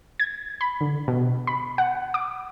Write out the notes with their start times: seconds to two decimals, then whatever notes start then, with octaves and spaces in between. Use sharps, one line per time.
0.20 G#6
0.61 B5
0.81 D3
1.08 B2
1.47 B5
1.78 F#5
2.14 D6